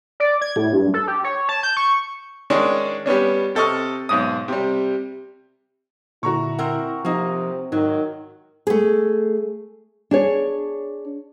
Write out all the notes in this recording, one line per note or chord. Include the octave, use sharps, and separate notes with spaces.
D5
G#6
A2
G2
A4
G4
C#5
A5
G6
C#6
D#3 G#3 C#4 D4
G3 B3 C#4 D4
C3 A4 D#5 C#6 F6
B1 G#2 D#6
C3 G3
A#2 D3 E4 F#4 A#5 C#6
C4 A#4 F#5
C3 F3 A#3 D#4
G#2 D#3 F#3 D#4
A3 G#4
D4 G#4 C#5